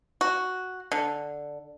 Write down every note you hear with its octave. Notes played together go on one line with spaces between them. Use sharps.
F#4
D3